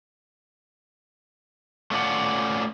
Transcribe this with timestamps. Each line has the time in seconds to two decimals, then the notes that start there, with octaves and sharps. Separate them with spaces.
1.91 A3 C#4 F4 D5 F#5